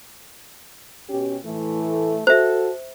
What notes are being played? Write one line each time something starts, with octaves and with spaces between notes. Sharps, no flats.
B2 C#4 G4
A2 E3 A3
F#4 A4 C5 E5